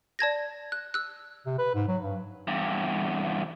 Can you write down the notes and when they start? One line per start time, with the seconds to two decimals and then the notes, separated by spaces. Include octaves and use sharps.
0.19 D5 A5 G#6 A#6
0.72 F#6
0.94 E6 F#6
1.46 C3
1.58 B4
1.74 G#2
1.88 F#3
2.02 G2
2.47 E2 G2